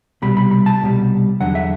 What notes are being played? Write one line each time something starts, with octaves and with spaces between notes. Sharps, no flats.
C2 B2 G3 B5
B5
B5
A5
C2 B2 G3
E2 D3 F#3 F#5
E5